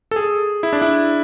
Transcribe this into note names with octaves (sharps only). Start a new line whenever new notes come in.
A4
G#4
E4
D4
E4